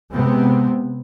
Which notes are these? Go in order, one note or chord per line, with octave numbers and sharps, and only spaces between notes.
C3 G#3 B3 C4